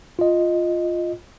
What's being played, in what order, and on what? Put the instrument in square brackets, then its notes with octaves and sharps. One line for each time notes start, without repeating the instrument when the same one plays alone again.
[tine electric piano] F4 D#5